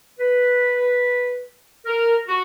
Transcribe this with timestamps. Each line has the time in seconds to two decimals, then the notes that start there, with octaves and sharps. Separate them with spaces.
0.19 B4
1.86 A#4
2.27 F#4